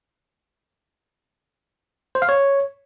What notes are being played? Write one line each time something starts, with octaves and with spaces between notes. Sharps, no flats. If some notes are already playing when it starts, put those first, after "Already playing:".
C5
F5
C#5